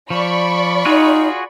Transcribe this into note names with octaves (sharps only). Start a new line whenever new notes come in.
F3 D5 B5 C#6
D#4 F4 F#4 G#4